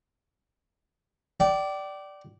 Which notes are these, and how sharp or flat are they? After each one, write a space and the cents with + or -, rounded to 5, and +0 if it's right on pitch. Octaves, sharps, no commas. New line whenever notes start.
D5 +0 G5 -35